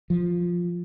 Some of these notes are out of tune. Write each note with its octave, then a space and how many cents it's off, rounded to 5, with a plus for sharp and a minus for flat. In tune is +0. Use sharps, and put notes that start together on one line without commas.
F3 +5